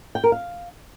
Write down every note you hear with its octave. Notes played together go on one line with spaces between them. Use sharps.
G5
A#4
F5